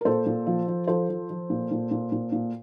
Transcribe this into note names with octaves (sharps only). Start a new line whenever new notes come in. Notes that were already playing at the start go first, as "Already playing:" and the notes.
A#4
A#2 A4 C5
A#2
F3
F3
F3 A4 C5
F3
F3
A#2
A#2
A#2
A#2
A#2